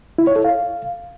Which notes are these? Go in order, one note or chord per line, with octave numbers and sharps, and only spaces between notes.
E4
C#5
A4
F5